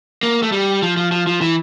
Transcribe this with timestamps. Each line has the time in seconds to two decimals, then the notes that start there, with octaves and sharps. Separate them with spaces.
0.23 A#3
0.43 A3
0.52 G3
0.83 F3
0.97 F3
1.12 F3
1.27 F3
1.41 E3